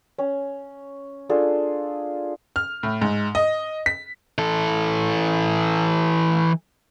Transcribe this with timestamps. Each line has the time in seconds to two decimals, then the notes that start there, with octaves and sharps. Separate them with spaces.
0.18 C#4
1.29 D4 F4 G#4 A4
2.56 F6
2.83 A2
3.01 G#2
3.35 D#5
3.86 B6
4.38 E3 A4